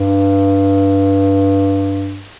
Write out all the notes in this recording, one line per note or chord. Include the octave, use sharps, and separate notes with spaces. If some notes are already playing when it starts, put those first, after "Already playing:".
Already playing: G2